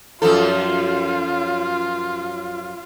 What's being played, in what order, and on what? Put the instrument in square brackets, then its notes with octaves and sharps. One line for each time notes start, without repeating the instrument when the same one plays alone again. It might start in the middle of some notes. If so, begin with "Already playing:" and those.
[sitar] F#2 F3 A4 [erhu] F4